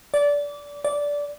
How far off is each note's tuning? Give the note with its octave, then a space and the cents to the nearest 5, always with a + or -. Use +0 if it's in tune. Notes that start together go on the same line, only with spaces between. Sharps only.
D5 -20
D5 -15